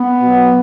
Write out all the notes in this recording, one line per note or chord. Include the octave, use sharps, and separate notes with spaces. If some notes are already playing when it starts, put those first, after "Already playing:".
Already playing: B3
B2 F#3